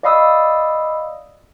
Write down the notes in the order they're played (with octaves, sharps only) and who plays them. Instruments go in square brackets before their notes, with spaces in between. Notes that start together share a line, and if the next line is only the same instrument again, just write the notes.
[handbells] D5 D#5 F5 B5 D#6 E6